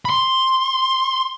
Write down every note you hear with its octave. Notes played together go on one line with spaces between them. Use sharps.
B5 C6